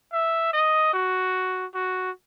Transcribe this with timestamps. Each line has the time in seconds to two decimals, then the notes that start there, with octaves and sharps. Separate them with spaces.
0.13 E5
0.53 D#5
0.93 F#4
1.74 F#4